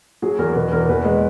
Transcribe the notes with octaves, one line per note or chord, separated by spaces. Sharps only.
F#3 G#4
E2 A#4
B2 B4
E2 A#4
E2 B4
G#3